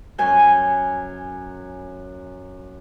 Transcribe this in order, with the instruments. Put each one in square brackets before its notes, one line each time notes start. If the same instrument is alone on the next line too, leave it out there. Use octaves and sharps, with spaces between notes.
[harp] F#2 G#5 G6